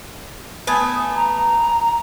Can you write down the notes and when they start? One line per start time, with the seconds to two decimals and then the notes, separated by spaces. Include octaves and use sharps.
0.67 A3 B3 G#5 D#6
1.15 A#5